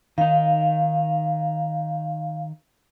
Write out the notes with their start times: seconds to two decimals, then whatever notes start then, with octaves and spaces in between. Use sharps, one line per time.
0.18 D#3 D#4 F5